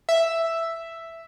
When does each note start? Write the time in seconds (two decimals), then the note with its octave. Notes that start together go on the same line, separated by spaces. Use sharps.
0.09 E5